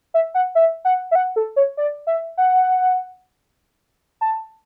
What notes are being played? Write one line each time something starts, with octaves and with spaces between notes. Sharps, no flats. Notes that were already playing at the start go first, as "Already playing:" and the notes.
E5
F#5
E5
F#5
E5
F#5
A4
C#5
D5
E5
F#5
A5